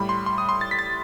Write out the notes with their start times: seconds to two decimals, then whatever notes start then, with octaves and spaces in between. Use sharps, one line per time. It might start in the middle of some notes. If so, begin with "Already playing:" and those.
Already playing: A2 G3 B5
0.09 C6
0.26 C6
0.38 D#6
0.49 C6
0.61 A6
0.71 B6
0.79 A6